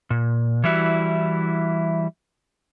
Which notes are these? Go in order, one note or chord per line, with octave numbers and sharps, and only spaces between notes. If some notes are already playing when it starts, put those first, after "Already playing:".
A#2
E3 G3 E4 F#4